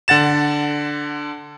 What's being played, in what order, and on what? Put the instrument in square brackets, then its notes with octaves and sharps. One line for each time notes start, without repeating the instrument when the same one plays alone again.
[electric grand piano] D3 F#5 A6 E7